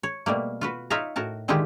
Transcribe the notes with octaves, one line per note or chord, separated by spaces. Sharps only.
C#5
B2 G3 A3 A#3
F4 F#4 B4
D#4 F4 C#5 E5 F5 A#5
A2 F#4 A#4 A5
D3 D#3 G#3 E4 F4 G4